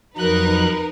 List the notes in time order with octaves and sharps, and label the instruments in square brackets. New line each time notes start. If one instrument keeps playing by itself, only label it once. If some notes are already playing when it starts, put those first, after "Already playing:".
[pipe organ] F2 F#3 F#6 [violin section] D#4 A#4 B4